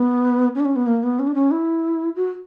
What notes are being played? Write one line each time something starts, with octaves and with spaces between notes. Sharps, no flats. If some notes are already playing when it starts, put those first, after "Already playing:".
Already playing: B3
C#4
D4
C#4
B3
A#3
B3
C#4
D4
C#4
E4
F#4